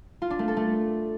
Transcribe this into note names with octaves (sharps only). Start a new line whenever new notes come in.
F4
D4
A3
A4
A3